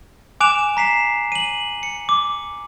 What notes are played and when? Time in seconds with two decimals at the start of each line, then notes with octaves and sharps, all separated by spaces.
0.40 G#5 D6 F#6 D7 E7 F7
0.77 A#5 B6 C7 E7
1.32 D#7 F#7
1.83 C#7
2.09 D6